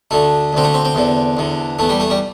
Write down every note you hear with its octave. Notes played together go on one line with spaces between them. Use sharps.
D2 D3 A3
D2 D3 C4
A3
C4
C4
E2 D3
E2 D3
E2 E3 A3
G3
A3
G3